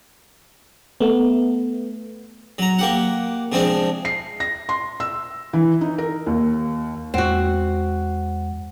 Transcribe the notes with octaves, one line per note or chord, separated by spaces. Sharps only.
A3 B3
F#3 A#5
A#3 G4 F#5
C3 F3 G#3 C4 D4
C7
A#6
C6
E6
E3
D#4
A#4
D#2
E2 G#3 C4 F#4 F#5